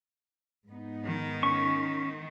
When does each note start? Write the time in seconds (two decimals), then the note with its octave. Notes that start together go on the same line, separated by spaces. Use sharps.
0.67 G#2 B3 D#4
1.05 D#3
1.43 C#4 C#6